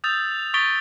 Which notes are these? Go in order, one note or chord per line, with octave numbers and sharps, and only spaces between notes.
D#6 E6 G6 A6 F7
C#6 D#6 A6 B6 D7 G7